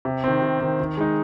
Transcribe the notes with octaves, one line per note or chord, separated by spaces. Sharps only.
C3
D#3 C4
C3
D#3 C4
D#3
G#3 D#4